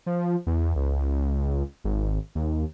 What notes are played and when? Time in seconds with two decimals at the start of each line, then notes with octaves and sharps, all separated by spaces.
0.06 F3
0.47 E2
0.76 C#2
1.85 G#1
2.35 D#2